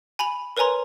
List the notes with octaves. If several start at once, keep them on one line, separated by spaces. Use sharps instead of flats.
G#5 B5 F7 F#7
A#4 B4 C#5 G#5 A#5 C6